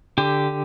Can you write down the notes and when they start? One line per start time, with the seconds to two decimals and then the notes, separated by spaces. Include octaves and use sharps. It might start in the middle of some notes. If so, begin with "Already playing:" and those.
0.18 D3 G4